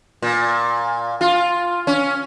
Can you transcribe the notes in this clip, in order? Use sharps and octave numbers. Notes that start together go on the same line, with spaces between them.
A#2
F4
C#4